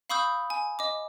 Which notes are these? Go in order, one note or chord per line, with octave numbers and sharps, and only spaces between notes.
F5 B5 C#6 D#6 E6 G6
G#5
D#5 D6